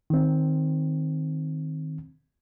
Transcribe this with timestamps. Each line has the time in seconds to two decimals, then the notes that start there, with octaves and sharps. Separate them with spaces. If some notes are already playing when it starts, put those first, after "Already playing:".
0.10 D#3 C4